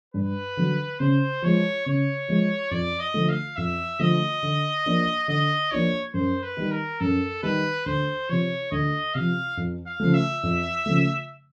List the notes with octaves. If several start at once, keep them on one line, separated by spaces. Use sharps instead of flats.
G2 B4
D3 F#3
C#3 C5
F3 G#3 C#5
C#3 C#5
F3 G#3
F2 D5
D#5
D3 F3 A3
F5
F2 E5
D3 F3 A3 D#5
D3
F3 A#3 D4 F4
D3 D#5
F3 A#3 D4 F4 C#5
F#2 C5
B4
D#3 G3
A#4
F#2 A4
D#3 G3 B4
D2 C5
C3 F3 C#5
D2 D#5
C3 F3 F5
F2
F5
C#3 F3 A3
E5
F2
C#3 F3 A3